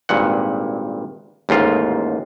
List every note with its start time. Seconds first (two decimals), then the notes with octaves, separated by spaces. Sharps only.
0.09 G#1 G2 A#2 F#5
1.49 A1 D#2 G#2 F4